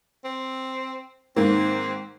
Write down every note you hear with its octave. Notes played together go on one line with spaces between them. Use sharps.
C4
G#2 D#3 A#3 C4